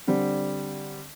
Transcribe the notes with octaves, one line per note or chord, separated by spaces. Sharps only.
D3 G3 C4